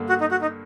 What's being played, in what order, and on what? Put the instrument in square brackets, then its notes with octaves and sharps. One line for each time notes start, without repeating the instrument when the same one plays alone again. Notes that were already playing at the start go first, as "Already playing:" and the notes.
Already playing: [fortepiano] G2 D3 A#3
[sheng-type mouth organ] F#4
D#4
F#4
D#4